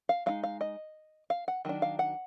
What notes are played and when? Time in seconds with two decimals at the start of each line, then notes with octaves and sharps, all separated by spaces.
0.09 F5
0.26 G#3 D#4 F5
0.43 F5
0.61 D#5
1.30 F5
1.48 F#5
1.65 D#3 F#3 D4
1.82 F5
1.99 F#5